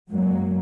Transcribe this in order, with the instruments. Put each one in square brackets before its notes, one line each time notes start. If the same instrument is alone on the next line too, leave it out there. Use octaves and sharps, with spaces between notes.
[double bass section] F#2 F#3 A#3 [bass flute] G#3